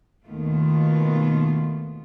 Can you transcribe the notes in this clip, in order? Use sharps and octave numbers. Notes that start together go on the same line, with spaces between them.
D#2 B2 D#3 A3 B3 F4